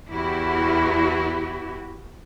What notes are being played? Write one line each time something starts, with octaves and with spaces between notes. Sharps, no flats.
E2 E4 F#4 G4